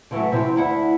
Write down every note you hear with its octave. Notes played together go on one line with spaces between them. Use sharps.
D3 E3 F#3 A3
C3 E3 F3 C4
D2 E4 F#5